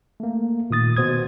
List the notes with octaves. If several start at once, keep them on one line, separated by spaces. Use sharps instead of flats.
A3 A#3
A#2 D#3 D#6 A6
B2 C5 D#6 G#6